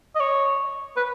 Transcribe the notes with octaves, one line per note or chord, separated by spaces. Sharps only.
D#5
C#5
B4